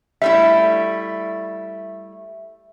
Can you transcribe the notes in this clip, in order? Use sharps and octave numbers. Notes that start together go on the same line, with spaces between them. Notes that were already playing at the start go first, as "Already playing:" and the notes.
G3 A3 E4 E5